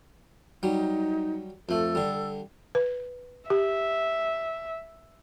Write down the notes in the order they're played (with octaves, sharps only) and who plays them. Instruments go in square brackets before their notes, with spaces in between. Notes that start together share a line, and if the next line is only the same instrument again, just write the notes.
[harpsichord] F#3 G3 [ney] D#4
[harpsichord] F2 A3 [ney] A4
[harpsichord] D3 G3
[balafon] B4
[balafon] G4 [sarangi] E5